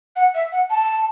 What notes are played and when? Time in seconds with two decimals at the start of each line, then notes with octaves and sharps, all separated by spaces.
0.16 F#5
0.34 E5
0.52 F#5
0.71 A5